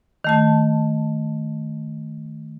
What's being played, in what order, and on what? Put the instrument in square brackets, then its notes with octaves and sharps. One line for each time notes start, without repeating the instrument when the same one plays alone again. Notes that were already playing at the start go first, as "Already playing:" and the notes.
[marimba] D#3 A3 A5